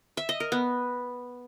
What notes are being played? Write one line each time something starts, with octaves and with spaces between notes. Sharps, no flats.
E5
D#5
A#4
B3